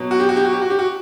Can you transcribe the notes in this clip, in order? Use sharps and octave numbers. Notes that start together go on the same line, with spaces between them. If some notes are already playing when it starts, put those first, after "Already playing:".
Already playing: B2 F#3
F#4
G4
F#4
G4
F#4
G4
F#4
G4
F#4